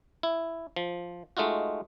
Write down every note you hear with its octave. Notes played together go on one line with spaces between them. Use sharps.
E4
F3
G#3 A3 D#4 F4 F#4